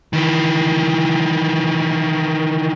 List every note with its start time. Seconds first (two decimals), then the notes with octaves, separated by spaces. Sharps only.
0.13 D#3 E3